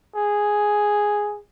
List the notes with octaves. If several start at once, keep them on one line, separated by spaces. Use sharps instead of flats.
G#4